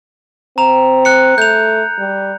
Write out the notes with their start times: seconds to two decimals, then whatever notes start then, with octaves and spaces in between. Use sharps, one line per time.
0.58 C4 A#5 F7
1.05 F#6 C#7
1.38 A3 G6 F7
1.99 G3